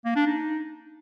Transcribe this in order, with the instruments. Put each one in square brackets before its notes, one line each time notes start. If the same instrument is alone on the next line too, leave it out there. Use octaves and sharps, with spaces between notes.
[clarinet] A#3
D4
D#4